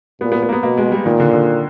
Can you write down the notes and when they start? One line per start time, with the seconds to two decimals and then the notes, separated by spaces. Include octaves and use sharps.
0.21 A#2 B3
0.32 B3
0.43 B3
0.49 A#3
0.53 B3
0.63 B2 A#3
0.78 G#3
0.92 G3
1.05 A#2 D#3
1.20 D3
1.33 D3